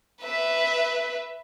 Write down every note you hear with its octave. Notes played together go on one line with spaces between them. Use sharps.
B4 E5